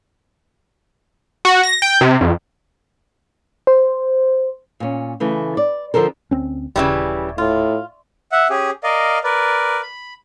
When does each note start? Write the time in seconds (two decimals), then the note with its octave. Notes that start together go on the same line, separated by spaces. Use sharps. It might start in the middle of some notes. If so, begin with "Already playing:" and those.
1.45 F#4
1.63 A#6
1.82 G5
2.01 C3
2.21 F2
3.67 C5
4.80 A#2 C#4
5.20 C#3 E3 A3
5.57 D5
5.94 D3 F3 C4 A4 A#4
6.31 D2 C4 C#4
6.76 D#1 C#3 E3 G3
7.38 A2 F4
8.32 E5 F#5
8.50 C#4 G4 G#4
8.84 A#4 D5 D#5 F5
9.24 A#4 B4 D5
9.82 B5